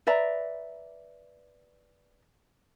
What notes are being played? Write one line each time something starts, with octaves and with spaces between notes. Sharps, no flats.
B4 D5 E5 A#5